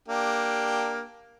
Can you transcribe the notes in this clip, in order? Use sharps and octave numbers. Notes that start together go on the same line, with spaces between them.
A#3 D4 G4